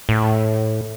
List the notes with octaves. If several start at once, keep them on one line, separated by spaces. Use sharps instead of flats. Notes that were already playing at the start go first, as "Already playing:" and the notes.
A2